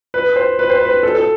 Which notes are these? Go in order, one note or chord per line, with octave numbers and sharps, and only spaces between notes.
B4
C5
B4
C5
B4
A4
A4